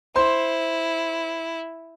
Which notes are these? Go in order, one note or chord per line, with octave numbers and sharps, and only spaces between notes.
E4 C5 C6